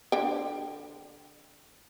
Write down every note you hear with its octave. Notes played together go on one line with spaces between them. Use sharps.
D3 G5